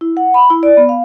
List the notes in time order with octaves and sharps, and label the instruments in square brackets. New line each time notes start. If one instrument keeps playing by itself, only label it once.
[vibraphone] E4
F#5
B5
E4
D5
B3
F5